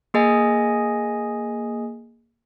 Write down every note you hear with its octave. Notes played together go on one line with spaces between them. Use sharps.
A#3 G#4 D#5 G#5